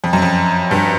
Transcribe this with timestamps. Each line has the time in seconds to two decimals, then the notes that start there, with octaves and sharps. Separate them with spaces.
0.04 F2
0.13 F#2
0.22 F2
0.71 G2